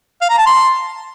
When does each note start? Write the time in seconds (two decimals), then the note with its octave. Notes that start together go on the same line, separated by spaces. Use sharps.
0.21 F5
0.30 A#5
0.38 A5
0.46 C6